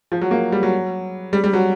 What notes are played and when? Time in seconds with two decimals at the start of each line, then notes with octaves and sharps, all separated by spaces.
0.12 F3
0.21 F#3
0.31 A#3
0.52 G3
0.63 F#3
1.33 G3
1.44 G3
1.53 F#3